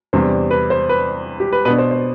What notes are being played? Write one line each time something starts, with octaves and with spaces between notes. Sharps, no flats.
E2 C3 G3 D4 C5
B4
C5
B4
G4
B4
B2 B3 D4 B4
C5
C5